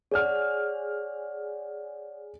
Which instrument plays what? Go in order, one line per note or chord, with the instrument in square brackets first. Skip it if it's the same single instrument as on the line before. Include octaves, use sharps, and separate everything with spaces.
[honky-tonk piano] G#4 F6 [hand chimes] C#5 D5 F#5